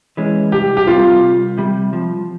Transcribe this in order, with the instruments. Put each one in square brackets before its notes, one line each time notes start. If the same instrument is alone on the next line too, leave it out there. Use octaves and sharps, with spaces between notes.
[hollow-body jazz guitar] E3 G#3 C#4
[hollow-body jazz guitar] C2 [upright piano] G4
[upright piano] G4
[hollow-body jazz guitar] C3 G3 [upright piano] F4
[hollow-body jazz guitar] C2
C3 G3
F3